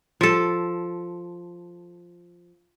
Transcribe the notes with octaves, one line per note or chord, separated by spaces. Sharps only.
F3 A4